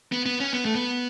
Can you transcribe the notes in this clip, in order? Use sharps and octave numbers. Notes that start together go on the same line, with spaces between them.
B3
B3
C#4
B3
A3
B3